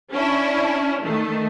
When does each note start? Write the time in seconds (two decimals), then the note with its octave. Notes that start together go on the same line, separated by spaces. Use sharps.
0.12 C#4 D4 E4
1.03 D#3 A3